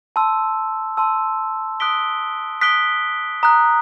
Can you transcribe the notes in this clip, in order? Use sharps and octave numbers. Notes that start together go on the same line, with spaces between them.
A5 C6 E6
A5 C6 E6
D#6 F#6 B6 D7 G7
D#6 F#6 B6 D7 G7
A#5 D#6 F#6